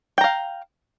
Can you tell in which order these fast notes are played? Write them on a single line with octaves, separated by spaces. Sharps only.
G5 A#5 F5